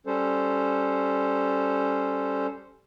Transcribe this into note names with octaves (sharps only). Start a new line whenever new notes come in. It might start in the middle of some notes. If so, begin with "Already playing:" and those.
G3 C#4 A4 C5